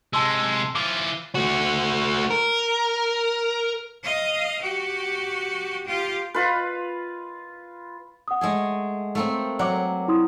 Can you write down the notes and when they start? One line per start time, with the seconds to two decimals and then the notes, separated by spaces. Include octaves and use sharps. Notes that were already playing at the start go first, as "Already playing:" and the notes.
0.13 C3 G#3 A5 C6 E6
0.75 E3 F4 D6
1.35 A3 F#4
2.30 A#4
4.03 D#5 F5
4.62 F#4 G4
5.86 F4 G4
6.34 F4 B4
8.28 F#5 D#6
8.41 G#3 A3 G#4
9.15 A3 A#3 C4
9.59 F#3 A#4 D5 F#5 D6
10.08 E4 C6 D#6